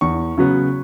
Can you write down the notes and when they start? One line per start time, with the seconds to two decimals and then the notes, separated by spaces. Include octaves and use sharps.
0.01 E2 C#6
0.38 C#3 F#3 B3